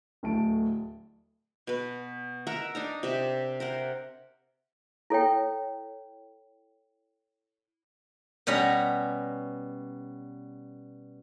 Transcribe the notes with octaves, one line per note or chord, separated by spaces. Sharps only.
D1 A2 A5 D7
B2 B4
A#4 E5 F#5 A#5
D4 D#4 A#5
C3 E5
A#4 C5 F#5
E4 A4 C#5 G5
B2 G3 C#4 A#5 B5